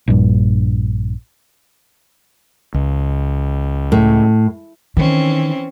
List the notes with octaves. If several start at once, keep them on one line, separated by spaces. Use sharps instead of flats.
A#1 G2
C#2
A2
D#3 E3 C4 C#4